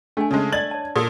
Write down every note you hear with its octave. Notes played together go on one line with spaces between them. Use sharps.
A3 D4 G#5
C#3 G#3 C#5 A5
D5 D#5 G#6 A6 F#7
C#5 A5
A#2 A4 D#6